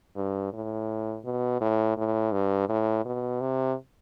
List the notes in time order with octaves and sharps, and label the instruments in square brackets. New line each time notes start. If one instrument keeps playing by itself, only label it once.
[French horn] G2
A2
B2
A2
A2
G2
A2
B2
C3